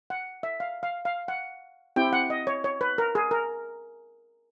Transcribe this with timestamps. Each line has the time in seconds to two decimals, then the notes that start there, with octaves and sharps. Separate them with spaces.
0.10 F#5
0.43 E5
0.60 F5
0.83 F5
1.05 F5
1.28 F#5
1.96 C4 E4 G4 G5
2.13 F#5
2.30 D#5
2.47 C#5
2.64 C#5
2.81 B4
2.98 A#4
3.15 G#4
3.31 A#4